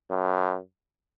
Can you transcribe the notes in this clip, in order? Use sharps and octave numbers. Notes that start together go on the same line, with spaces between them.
F#2